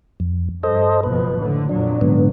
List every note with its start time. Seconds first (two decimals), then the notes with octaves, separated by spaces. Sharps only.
0.20 F2
0.63 G2 A4 C5 D#5
1.03 F#1 B2 F3 B4
1.36 A2 D3
1.69 F2 A#2 F#3 D4
2.01 G#2 D3 B3